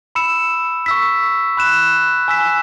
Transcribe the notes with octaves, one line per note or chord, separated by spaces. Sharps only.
B5 E6 C#7 E7
C#6 E6 B6
B5 F#6 E7
G#5 E6 B6 E7